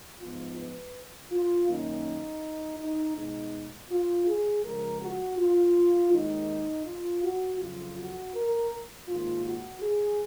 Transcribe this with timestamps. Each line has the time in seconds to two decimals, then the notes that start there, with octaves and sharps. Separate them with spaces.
0.20 G#2 F3 B3 D#4 F4
0.57 B4
1.31 F4
1.68 F#2 D#3 A#3 C#4 D#4
2.80 D#4
3.16 B2 G#3 D#4
3.91 F4
4.27 G#4
4.64 C#3 F3 G#3 A#4
5.01 F#4
5.38 F4
6.12 D#2 D#3 G#3 D#4
6.86 F4
7.23 F#4
7.60 F2 C#3 F#3 F4
7.97 F#4
8.35 A#4
9.08 G#2 D#3 A#3 F4
9.45 F#4
9.82 G#4